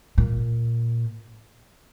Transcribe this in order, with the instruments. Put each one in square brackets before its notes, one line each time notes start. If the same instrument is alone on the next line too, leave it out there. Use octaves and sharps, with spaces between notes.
[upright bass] A#2